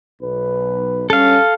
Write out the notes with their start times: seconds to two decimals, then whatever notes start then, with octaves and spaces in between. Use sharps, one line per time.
0.22 B1 B4
1.10 G2 C#4 A4 F5